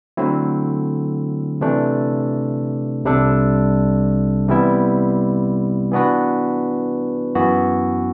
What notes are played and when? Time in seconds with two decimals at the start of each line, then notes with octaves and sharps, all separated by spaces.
0.17 D3 F#3 A3 C4 E4
1.61 C3 E3 A3 D4
3.05 C2 C3 G3 D4 A4
4.49 C3 E3 G3 B3 E4
5.92 E3 B3 D4 F#4 B4
7.35 F#2 E3 B3 F#4